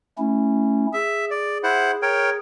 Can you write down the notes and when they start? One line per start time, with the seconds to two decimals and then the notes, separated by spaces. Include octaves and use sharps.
0.18 A3 C#4 E4
0.93 G#4 E5
1.30 D5
1.63 E4 C5 F#5
2.02 A#4 C#5 G5